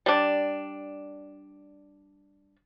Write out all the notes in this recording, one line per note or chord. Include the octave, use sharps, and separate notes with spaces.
G3 D4